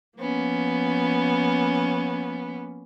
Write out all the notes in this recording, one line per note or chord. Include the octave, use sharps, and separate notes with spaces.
F3 A#3 B3 C#4